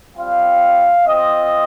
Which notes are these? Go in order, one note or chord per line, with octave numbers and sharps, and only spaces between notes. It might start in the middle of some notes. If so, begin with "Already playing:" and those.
G3 C4 F4 F5
C4 F4 D#5